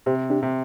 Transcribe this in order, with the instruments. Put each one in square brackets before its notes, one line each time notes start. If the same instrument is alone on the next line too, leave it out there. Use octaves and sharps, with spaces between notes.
[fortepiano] C3 [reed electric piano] G4 C5
[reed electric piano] D4 G4
[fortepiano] C3